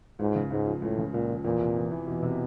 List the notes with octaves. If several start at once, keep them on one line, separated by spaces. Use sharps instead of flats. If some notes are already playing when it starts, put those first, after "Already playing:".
C#2 G#2
C#3
C#2 G#2
F3
C#2 A2
C#3
C#2 A#2
F3
E2 A#2
C3
E2
E3
E2 B2
C3